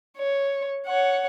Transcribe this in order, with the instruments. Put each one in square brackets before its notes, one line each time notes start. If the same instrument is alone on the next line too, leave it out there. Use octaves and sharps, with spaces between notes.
[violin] C#5
C#5 F#5